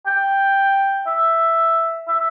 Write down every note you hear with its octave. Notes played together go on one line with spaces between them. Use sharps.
G5
E5
E5